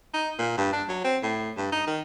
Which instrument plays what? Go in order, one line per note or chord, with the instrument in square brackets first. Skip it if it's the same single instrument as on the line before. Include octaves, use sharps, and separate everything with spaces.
[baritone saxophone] D#4
A#2
G2
D4
F#3
C4
A2
G2
D#4
D#3